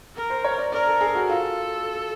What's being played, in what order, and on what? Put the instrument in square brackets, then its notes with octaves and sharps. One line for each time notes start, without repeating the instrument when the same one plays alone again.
[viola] A#4
[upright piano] C5
C#5
D5
[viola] A#4 [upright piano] D5
[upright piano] A4
G#4
F#4
[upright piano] F4 [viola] A4